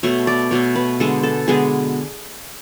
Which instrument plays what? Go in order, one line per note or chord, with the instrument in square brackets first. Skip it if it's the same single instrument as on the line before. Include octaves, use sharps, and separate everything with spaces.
[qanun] B2 A3 C#5
D5
B2 A3 C#5
B4
D3 G#3 B3 A4
A4
D3 G#3 B3 G#4